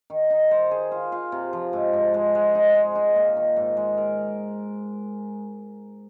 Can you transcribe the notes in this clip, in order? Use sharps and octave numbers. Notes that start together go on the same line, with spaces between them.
D#3
D#4
C5
G#4
F4
F4
C3
F3
G#2
G#2
G#3
G#3
D#4
G#3
D#4
A#2
D#3
G#2
G#3
A#4